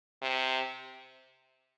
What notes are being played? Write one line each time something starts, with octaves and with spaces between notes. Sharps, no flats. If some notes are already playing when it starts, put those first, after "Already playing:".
C3